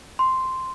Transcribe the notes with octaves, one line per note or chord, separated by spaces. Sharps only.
C6